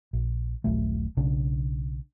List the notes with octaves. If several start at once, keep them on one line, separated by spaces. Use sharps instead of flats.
A#1
D#1 A#1 F#3 A3
B1 C#3 D4